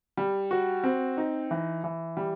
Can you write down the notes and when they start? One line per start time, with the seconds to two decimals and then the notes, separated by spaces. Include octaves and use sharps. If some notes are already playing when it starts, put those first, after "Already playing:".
0.17 G3
0.51 F#4
0.84 C4
1.17 D#4
1.51 E3
1.84 E3
2.17 G3